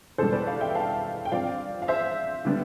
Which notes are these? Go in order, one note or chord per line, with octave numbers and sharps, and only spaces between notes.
E2 B2 G3 A4 C5
B4 D5
D5 F5
E5 G5
F5 A5
G5
G2 F3 C4 D5 F5
F5
C5 E5
D3 G3 B3 D4